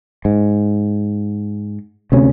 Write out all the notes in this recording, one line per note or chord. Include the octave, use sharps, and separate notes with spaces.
G#2
D2 C3 C#4